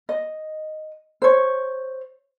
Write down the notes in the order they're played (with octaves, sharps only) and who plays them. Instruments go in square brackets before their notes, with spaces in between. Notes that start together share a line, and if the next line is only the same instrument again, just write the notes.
[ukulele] D#5
C5 C#5